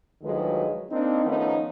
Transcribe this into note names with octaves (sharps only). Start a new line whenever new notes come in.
D2 D#3 F3 F#3 G#3 B4
A#3 C4 D4 D#4
D#3 F3 A3 B3 C#4 D#4